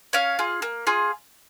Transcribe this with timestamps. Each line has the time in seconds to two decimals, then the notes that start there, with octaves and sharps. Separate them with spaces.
0.13 C#4 C#5 F5
0.39 F4 G#4
0.62 A#3
0.87 F4 G#4